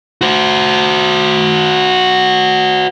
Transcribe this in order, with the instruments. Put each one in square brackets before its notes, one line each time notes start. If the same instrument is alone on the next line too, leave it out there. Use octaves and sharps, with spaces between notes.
[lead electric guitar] F#4 C5